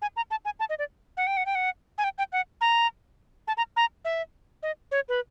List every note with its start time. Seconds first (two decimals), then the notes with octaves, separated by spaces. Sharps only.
0.02 G#5
0.16 A#5
0.31 A5
0.45 G#5
0.60 A5
0.69 D#5
0.79 D5
1.17 F#5
1.27 G5
1.37 F#5
1.46 G5
1.55 F#5
1.98 G#5
2.04 G5
2.18 G5
2.32 F#5
2.61 A#5
3.48 A5
3.57 A#5
3.76 A#5
4.05 E5
4.63 D#5
4.92 C#5
5.09 B4